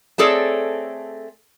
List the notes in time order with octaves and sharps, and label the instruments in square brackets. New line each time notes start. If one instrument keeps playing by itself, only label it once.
[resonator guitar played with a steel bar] A3 C4 G#4 A4 C#5 D5